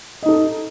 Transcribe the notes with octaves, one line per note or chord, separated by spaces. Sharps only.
D#4 A4 D#5